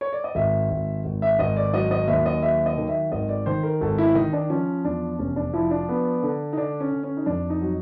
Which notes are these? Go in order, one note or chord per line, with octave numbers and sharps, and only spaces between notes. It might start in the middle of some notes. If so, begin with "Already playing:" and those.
C#5
D5
D#5
G#1 E5
G#1
G#1
E5
G#1 D#5
D5
F#3 D#5
D#5
D#2 E5
D#5
F#3 E5
D#5
D#3
E5
G#1 D#5
D5
D#3 C5
A#4
G#1 A4
E4
D#3 D#4
D4
F3 C#4
E2 D4
F1 C#4
D4
F3 E4
D4
B3
D3
D#4
D3 D4
C#4
D3
C#4
D#4
F2 D4
D#4
F#3